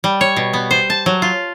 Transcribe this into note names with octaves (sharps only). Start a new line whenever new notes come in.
G3
C#5
B2
B3
C5
A5
F#3
F4